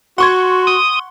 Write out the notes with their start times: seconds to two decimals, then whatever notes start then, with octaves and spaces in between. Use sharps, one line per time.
0.18 F#4 F#5 C6 C#6 G#6
0.67 D#6